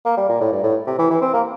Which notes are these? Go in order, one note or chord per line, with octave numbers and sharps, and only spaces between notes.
A#3
G3
A#2
A2
G2
A2
C3
E3
E3
C4
A#3